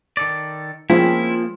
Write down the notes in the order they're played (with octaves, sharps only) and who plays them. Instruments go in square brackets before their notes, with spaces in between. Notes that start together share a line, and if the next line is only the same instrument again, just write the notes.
[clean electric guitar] D#3 A4 D5
[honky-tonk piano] F3 [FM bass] G#3 [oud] A#3 C4 C#4 [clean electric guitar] E4